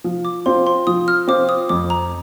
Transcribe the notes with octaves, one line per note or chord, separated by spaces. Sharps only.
F3
D6
C4 F4 C5 C6
C6
F3 D#6
F6
C4 F4 C5 D6
D#6
F2 D6
A#5